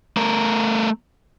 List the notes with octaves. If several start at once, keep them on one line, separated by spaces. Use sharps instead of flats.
A3 A#4